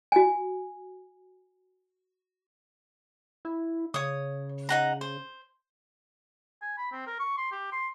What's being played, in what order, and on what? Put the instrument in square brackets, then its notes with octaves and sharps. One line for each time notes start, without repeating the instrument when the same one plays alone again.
[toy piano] F#4 G#5
[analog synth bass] E4
[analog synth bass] C#3 [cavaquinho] C#5 D#6
[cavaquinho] D#4 F#5 A#5
C5
[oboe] G#5
B5
C4
A#4
C#6
C6
G4
C6